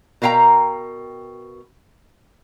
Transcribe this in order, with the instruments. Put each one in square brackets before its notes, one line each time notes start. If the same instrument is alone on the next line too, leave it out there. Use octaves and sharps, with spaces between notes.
[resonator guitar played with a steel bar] B2 A#4 F5 G5 A#5